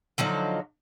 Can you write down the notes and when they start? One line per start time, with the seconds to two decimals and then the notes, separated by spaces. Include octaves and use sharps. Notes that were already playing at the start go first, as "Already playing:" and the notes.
0.18 D3 F3 F#3 D#4